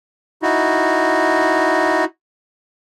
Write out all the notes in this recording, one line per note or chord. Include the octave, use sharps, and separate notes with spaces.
D#4 E4 F#4